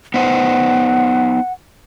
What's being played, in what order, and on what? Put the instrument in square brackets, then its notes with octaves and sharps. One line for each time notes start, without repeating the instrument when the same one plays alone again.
[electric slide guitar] B3 D#4 C5 [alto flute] F#5